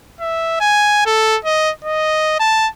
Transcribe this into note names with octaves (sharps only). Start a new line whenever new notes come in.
E5
G#5
A4
D#5
D#5
A5